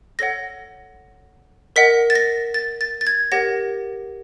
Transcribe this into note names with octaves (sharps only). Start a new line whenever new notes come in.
A4 C#5 F#5 A#6
A#4 D#5 F#5 B6
A6
A#6
A6
A6
A6
G#6
G4 A#4 C#5 F#5 A#6